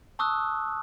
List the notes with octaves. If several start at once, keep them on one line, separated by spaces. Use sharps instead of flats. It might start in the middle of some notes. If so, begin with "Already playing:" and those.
A5 C#6 D#6 E6 F#6